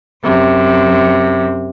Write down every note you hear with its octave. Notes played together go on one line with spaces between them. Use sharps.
F#2 C3